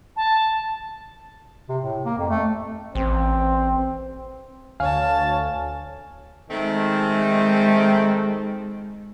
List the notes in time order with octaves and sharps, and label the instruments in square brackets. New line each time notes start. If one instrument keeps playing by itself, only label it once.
[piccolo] A5
[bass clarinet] C3
A2
A#3
F2
A3
[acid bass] A1 [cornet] C4
[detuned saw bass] D2 [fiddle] C#5 A5 [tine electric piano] F5 G#5 F6
[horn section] D#3 A3 C4 [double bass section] G#3